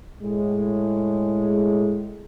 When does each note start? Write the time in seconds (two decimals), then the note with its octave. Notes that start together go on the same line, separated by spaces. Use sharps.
0.22 A2 G#3